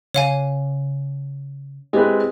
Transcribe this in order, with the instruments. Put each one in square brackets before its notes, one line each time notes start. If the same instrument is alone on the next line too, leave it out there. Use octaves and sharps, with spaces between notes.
[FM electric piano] C#3 [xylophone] C#5 F5 G#5
[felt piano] G#3 C4 B4 [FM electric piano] E4 G4